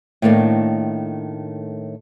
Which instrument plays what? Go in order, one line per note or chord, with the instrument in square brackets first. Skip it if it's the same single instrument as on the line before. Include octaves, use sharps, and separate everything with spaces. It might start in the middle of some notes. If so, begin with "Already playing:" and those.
[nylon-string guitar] A2 D#3 A3 A#3 D4